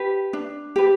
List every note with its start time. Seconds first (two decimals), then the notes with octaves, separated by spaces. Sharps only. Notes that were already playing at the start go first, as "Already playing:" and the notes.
Already playing: G4 B4
0.33 D4
0.76 G4 B4